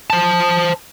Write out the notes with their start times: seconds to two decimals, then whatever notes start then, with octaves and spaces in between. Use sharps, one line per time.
0.10 C5 A5